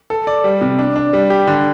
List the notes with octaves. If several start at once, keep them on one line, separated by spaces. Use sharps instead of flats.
A4
D5
G3
C3
D4
D4
G3
G4
D3